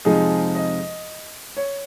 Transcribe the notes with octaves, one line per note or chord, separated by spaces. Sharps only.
F2 C3 F3 G#3 D#4 G#4
D#5
C#5